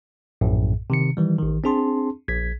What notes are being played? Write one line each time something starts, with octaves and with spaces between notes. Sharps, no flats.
A#1 F#2 A2
C3 D#3 C#7
D#3 E3 G3
A1 D#3
C4 D4 G#4 A5 C6
A#1 G#6 B6